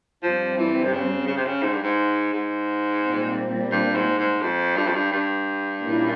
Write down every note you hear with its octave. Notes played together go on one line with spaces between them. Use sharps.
G2 F3 G3 C4
E3
C3
C#3
C#3
C3
C#3
G#2
G2
G#2
G#2
A#2 G3 C4
G2
G#2
G#2
F2
G2
F2
G2
G2
A#2 G3 A#3 C#4 E4